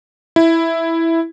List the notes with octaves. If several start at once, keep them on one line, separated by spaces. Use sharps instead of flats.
E4